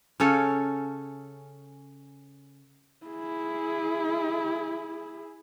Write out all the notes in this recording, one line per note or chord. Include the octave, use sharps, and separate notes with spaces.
C#3 C#4 A4
E4 G#4